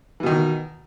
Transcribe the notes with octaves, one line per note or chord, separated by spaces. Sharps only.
B2 D#3 E3